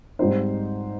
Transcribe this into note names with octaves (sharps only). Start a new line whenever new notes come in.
G#2 G3 C4 D#4 C5